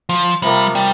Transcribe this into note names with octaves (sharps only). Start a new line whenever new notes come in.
F3
C3 F3 G3 A#3
G3